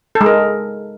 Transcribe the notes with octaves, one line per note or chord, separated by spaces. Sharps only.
A4
G#3
A#4